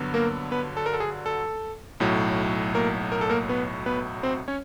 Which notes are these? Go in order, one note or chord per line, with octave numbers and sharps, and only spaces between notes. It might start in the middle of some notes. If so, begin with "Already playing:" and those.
Already playing: G2 D3 F#3 B3
A#3 A#4
B3 B4
A4
A#4
A4
G#4
A4
B1 A2 F#3
A#3 A#4
A#4
A4
A#3 A#4
B3 B4
B3 B4
C4 C5
C#4 C#5